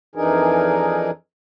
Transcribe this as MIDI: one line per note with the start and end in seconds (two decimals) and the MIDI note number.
0.16 1.11 41
0.16 1.11 52
0.16 1.11 62
0.16 1.11 63
0.16 1.11 68
0.16 1.11 70